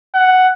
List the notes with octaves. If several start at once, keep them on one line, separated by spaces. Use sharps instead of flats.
F#5